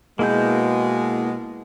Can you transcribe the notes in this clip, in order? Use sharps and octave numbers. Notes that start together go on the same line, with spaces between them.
B2 G#3 A#3 E4 G6